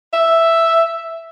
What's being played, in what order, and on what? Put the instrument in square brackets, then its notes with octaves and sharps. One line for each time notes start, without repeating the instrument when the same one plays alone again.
[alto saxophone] E5